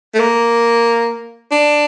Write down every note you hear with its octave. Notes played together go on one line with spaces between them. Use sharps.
A3
A#3
D4